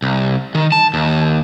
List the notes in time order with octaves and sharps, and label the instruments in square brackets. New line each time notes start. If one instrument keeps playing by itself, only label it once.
[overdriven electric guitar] C2
D#3
A5
D#2